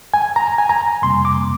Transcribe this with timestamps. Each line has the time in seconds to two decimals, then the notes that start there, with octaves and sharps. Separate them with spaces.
0.14 G#5
0.36 A#5
0.58 G#5
0.69 A#5
1.02 F2 C3 G3 A#3 C6
1.25 D6